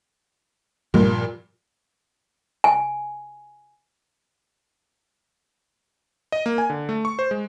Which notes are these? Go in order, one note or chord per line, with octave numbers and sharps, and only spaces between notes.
G2 A#2 F3 G3 A#3
G#5
D#5
A#3
G#5
D3
A3
C#6
C5
G#3